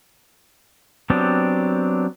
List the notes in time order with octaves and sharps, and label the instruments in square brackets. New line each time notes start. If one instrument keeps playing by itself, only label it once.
[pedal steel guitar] F#3 B3 C4 D4 G4